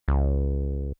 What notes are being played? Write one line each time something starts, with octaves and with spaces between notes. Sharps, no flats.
C#2